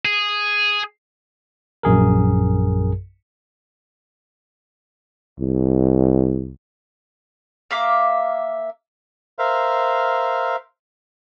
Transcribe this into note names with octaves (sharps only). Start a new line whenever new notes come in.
G#4
A#1 F#2 G#4 A#4
C2
A#3 E5 F5 D6
A#4 C5 E5 F5